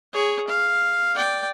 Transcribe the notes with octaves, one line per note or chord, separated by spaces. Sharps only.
G#4 C#5
F5
D5 G5